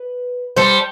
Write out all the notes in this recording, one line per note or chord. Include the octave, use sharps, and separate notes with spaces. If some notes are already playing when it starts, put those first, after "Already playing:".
Already playing: B4
G3 A4 C5